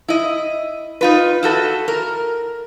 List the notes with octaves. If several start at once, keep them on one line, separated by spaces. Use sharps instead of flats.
E4 D#5
D#4 F4 B4
E4 F#4 A4
A#4